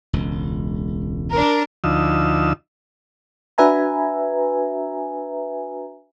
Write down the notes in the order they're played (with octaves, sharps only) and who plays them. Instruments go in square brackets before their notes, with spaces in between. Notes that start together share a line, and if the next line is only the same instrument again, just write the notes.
[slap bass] E1 C#2
[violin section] D4 A#4
[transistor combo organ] D2 F3 D#4 E6
[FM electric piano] D4 F#4 B4 E5 G#5 A#5